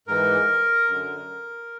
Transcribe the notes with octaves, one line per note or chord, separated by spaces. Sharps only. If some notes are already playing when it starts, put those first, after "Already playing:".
G#2 E3 A#4
F#2 D3